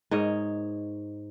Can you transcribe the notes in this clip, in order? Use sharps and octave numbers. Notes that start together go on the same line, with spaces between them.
G#2 A#4 C#5 D#5